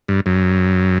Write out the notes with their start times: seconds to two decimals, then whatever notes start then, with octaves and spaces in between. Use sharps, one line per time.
0.08 G2
0.26 F#2